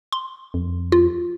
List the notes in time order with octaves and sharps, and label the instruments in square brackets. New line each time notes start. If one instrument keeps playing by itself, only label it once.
[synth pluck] C6
[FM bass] F2
[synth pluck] F4